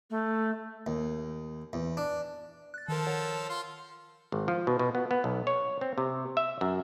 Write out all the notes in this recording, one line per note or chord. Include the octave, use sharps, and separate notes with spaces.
A3
D#2
E2
D4
F#6 A6
D#3 F3 A4 A#4
A#4 C#5 F#5
F4 C6
G#1
F3
B2
B2
B3
B3
B1
C#5
C4
C3
E5
F#2